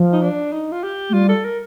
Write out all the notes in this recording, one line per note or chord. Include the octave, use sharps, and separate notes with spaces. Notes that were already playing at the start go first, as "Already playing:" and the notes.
Already playing: F3
D#4
D4
D#4
F4
G4
A3
G3 F4
A4
A#4